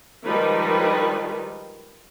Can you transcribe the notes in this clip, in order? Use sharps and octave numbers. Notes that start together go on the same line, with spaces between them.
D#3 F3 G3 G#3 D#4 B4